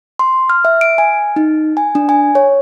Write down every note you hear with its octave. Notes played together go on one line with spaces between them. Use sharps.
C6
F6
E5
D7
G#5
D#4
G#5
D4
G#5
C#5